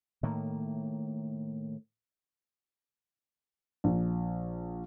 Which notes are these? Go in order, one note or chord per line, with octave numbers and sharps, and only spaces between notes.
A2 D#3 A#3
A#1